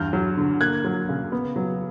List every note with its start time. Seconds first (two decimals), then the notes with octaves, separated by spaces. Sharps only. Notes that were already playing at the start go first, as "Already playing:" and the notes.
Already playing: E2 G2 F6 G6
0.13 F#3
0.37 D3
0.61 A#3 F#6 G#6
0.85 F#3
1.09 C#3
1.32 B3
1.56 F#3